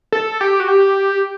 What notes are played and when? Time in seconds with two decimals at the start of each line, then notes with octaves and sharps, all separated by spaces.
0.12 A4
0.41 G4
0.60 F#4
0.68 G4